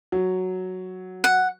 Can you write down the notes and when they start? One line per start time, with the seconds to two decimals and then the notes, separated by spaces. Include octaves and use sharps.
0.12 F#3
1.24 F#5